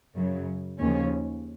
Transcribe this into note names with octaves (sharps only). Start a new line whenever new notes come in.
F#2 C#3 F#3
D#2 C#3 F3 C#4